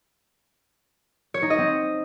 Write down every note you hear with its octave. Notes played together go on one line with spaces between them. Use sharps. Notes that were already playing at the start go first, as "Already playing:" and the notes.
C#5
D#4
D#5
C4